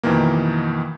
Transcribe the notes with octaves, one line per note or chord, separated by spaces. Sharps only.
F2 B2 D#3 E3 A#3